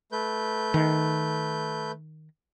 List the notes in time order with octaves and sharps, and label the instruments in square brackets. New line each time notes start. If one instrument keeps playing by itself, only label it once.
[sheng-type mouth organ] A3 B4 G6
[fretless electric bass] D#3